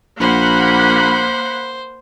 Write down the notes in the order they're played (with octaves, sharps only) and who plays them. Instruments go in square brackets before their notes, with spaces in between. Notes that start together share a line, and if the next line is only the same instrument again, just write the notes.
[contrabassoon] A#1 [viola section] A#3 F#5 B5 [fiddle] C5